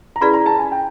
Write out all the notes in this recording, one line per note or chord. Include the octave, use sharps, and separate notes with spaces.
A#5
C#4 E4 G#4 B4 D5 B5
A#5
A5
G#5
G5